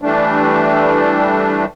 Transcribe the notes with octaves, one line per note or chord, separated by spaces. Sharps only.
E3 G3 A3 D4